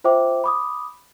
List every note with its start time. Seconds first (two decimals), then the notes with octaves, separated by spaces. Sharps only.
0.04 F4 C5 E5 G5 D6
0.44 B5 D6 D#6